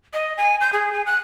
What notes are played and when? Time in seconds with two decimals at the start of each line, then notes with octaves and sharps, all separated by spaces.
0.14 D#5
0.37 G#5
0.61 G6
0.73 G#4
0.93 G#5
1.06 F#6